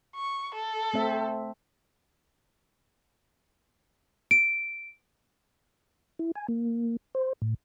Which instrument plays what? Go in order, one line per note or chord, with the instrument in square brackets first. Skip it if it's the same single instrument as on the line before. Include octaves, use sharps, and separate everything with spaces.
[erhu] C#6
A4
[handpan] A3 C4 E5
[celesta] D7
[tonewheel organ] E4
G#5
A#3
C5
A2